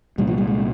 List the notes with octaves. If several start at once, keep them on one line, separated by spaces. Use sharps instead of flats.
C2 A#2 G3
F3
G3
G#3